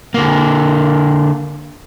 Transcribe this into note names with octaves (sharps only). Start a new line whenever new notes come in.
D3 A#3